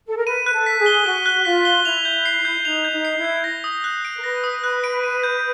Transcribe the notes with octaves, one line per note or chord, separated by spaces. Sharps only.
A4
A#4
B4 D#7
F#6
A4
B6
G#4
G7
F#4 D#7
F#6
F4 B6
G7
E4 F7
G6
C7
G6
D#4 F7
G6
D#4
C7
E4
G6
A#6
D#6
F#6
D7
A#4
B4 A#6
D#6
F#6
D7
D#7
G6